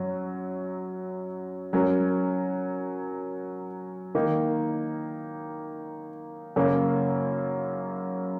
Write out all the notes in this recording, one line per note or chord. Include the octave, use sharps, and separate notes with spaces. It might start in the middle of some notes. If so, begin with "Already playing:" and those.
Already playing: F#2 F#3
F#3 C#4 A#4
D#3 A#3 D#4
F#2 C#3 A#3